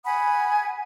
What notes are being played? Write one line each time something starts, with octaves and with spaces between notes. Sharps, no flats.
F#5 G#5 B5 D#6